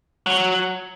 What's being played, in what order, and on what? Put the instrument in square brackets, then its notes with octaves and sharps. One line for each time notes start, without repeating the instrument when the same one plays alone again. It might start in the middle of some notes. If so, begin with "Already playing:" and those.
[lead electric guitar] F#3